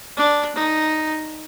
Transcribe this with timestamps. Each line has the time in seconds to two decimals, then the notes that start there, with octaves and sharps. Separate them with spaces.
0.17 D4
0.55 D#4